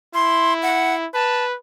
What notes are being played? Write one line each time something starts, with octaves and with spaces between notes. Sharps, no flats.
E4 C6
F#5
B4 A5